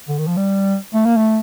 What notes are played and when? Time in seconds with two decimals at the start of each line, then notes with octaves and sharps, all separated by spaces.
0.09 D3
0.18 D#3
0.28 F3
0.37 G3
0.94 A3
1.06 A#3
1.17 A3